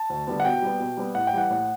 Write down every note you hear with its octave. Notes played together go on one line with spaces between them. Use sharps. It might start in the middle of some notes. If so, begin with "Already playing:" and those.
Already playing: A5
D2
D3 G3 B3
F#5
B2 G5
G3 B3
B2
G3 B3
A2 F#5
G5
E3 G3 F#5
A2